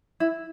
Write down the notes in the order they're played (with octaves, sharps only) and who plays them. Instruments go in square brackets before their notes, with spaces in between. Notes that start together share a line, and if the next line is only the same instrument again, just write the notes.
[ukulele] E4